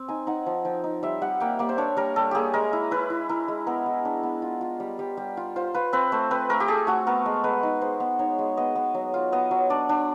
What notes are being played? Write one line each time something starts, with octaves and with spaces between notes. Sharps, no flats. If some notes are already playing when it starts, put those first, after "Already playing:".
Already playing: C4
D#4 G#5
D#4 F#5
F3
F3 G5
D#4
G3 E5
G3 F#5
A#3 G5
A#3 D5
C5
D4 C#5
G3 A#4
G3 A4
A#3 G4 G#4
G#3 A#4
E4
E4 B4
E4
E4 A#4
G#3
B3 A#4
G#3
D4
B3
F4
F4
G3
G3
G3
F4
F4 C5
F4 B4
C4 B4
A3 C5
C4 B4
A3 A#4
G4
A3 G#4
A3 F#4
B3 A#4
G#3
G#3 B4
D#4
G#3 C5
B3
D#4 C#5
G#3
B3 D#5
B3
F#3
F4
B3 D#5
F#3
D4 D5
D4